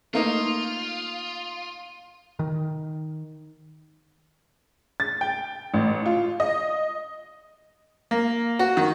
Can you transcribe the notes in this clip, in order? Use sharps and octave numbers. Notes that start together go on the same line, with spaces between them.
A3 A#3 D#4 F4
D#3
A6
G5
A1
F4
D#5
A#3
F#4
D#3